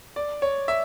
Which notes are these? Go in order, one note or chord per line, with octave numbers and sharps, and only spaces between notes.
D5
C#5
E5